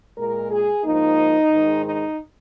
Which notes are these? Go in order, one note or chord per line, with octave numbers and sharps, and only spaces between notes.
A#2 G#3 A#4
G#4
G#2 F3 A#3 D#4
G#2 D#3 G#3
D#4